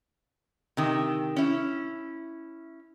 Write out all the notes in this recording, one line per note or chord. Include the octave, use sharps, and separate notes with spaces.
C3 D#3
C#4 E4